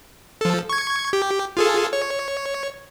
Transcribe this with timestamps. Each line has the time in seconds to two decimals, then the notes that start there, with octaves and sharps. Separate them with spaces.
0.41 F3 A4
0.69 C#6 G#6
1.13 G4
1.57 F4 G#4 A4
1.93 C#5